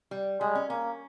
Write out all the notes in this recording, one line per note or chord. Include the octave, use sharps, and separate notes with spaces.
G3
G3 G#3
C#4
A#3 C#4